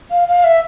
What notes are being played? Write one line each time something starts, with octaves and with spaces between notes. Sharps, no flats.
F5
F5
E5